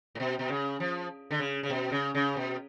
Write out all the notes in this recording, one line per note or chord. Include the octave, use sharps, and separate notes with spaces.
A2
B2
B2
C#3
F3
D3
C#3
C#3
B2
C#3
C#3
B2